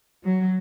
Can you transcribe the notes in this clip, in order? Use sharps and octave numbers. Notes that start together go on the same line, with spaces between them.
F#3